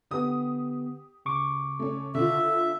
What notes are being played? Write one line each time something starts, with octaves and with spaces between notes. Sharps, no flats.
D3 B3 G4 D#6
C#3 C#6 D6
A3 C#4
D3 F4 E5